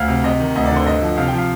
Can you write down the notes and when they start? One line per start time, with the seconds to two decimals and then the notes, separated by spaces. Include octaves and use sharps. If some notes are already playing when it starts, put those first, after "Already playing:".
Already playing: D2 F5
0.08 C3
0.24 C3 D#5
0.40 D#3
0.55 D2 D#5
0.66 D5
0.71 D3 C5
0.86 G2 D#5
1.02 F3
1.17 C3 F5
1.28 G5
1.33 F3 F5